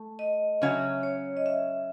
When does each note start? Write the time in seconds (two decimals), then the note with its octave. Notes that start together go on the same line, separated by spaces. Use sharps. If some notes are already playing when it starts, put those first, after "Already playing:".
Already playing: A3
0.19 D#5
0.62 C#3 F#3 C#4 E5
1.03 C#5
1.37 D#5
1.46 E5